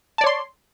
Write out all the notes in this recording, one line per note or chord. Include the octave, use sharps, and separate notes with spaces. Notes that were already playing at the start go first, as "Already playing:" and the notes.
C#5 D5 A5 C6